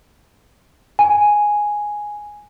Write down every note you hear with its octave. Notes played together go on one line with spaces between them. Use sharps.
G#5